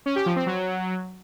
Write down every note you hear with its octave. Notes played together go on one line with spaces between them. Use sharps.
C#4
G4
F3
C4
F#3